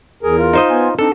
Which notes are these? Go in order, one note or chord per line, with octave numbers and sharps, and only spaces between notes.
E2 G#4 A#4
F4
D#4 C5 D#5
B3 G#5
C4 D4 D#4 A4